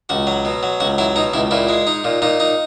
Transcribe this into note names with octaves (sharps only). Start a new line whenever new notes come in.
C#2 F#4
F#3
B2
F#3
C#2 F#4
F#3 E4
B2 D#4
C#2 E4
A#2 E4
G#3
D#4
A#2
A#2 D#4
D#4